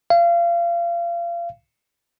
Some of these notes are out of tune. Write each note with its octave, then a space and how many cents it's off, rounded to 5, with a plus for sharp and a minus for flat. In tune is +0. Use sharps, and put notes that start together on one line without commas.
F5 -30